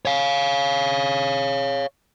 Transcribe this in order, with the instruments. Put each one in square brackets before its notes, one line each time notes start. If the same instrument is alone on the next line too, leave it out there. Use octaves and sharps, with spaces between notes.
[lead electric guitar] C#5 F5